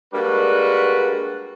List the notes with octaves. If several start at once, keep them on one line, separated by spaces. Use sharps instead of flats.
G3 G#3 A#3 D4 F#4 B4